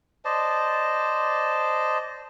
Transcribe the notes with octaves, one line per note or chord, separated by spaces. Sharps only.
C5 D5 D#5 A5